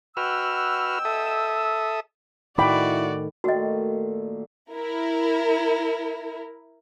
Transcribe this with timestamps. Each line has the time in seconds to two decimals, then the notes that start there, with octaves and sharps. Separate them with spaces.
0.17 B2 F#4 B4 G5 E6 F6
1.05 A4 E5 D#6
2.58 A2 D#3 E4 F#4 D5 G5 B5 D6
3.44 A#2 D#3 A3 F#4 D#5
4.71 E4 A#4